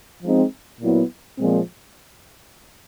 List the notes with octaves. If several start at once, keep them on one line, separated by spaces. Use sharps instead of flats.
F3 G#3 C4 D#4
A#2 F#3 B3 E4
A#2 F3 G#3 C4